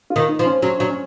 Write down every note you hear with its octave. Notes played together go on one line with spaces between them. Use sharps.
F4
D#3
D#4
F3
C#4
F#3 C#4
F#3 D4
C#4